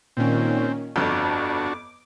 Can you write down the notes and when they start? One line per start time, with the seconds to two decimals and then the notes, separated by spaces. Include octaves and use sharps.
0.17 A#2 D#3 C4 C#4
0.96 G1 F2 D4 F#4 D6